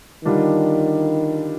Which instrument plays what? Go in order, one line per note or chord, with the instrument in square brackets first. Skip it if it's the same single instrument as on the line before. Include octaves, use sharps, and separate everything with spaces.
[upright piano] D3 G3 D4 F4 [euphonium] D#3